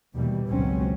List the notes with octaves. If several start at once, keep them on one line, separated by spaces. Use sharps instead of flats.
D#2 B2 E3 G3
G#1 C#2 B2 F#3 C4 C#4